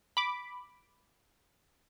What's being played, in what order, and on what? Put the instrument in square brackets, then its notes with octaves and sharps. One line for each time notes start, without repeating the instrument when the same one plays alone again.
[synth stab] B5 D6